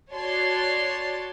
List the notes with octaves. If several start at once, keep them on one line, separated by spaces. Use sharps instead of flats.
F#4 C#5 D5 A5 C6